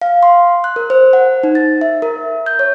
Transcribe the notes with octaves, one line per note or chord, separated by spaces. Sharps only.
F5
C6
F#6
A#4
C5
F#5
D#4
A6
E5
A#4
G6
C#5